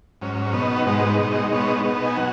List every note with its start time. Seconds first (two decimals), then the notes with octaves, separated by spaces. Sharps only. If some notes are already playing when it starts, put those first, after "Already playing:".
0.21 G#2 F#3 C#4
0.53 B2 B3 D#4 C#5
0.76 F#4
0.86 G#2 G#3 B3 D#4
1.19 B2 G#3 D#4
1.35 F#4
1.52 B2 G#3 B3 D#4 C#5
1.85 B2 B3 D#4
2.06 G#5
2.17 F#3 F#5